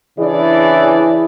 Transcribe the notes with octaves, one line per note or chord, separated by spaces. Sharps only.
C#3 E3 D4 E4 G#4 D5